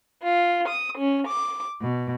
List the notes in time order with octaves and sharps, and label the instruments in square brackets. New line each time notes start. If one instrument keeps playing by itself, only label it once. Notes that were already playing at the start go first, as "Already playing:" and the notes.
[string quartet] F4
D#6
C#4
D6
B2